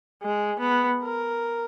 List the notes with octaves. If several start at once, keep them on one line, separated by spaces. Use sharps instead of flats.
G#3
B3
A#4